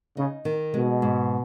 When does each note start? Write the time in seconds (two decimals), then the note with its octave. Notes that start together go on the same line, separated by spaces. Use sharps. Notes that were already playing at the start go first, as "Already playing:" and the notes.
0.17 C#3 D#4
0.45 D#3
0.74 B2 G#3
1.02 G#2